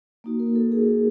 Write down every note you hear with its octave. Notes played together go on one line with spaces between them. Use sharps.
A#3 D#4 F#4
A#4
A4
G#4